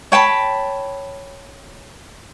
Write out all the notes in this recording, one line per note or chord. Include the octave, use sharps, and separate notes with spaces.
C#5 G5 A5 B5